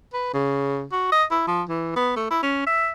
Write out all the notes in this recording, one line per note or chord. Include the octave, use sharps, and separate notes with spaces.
B4
C#3
F#4
D#5
E4
F3
E3
B3
A3
E4
C#4
E5